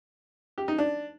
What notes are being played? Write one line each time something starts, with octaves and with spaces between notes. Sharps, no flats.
G4
D#4
D4